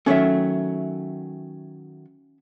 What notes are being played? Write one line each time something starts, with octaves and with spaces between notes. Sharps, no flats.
D#3 F#3 A3 C#4 E5